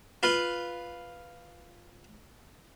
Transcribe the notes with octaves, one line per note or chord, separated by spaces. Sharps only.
F4 B4